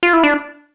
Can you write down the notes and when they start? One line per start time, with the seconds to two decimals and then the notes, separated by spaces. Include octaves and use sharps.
0.03 F4
0.13 E4
0.23 D4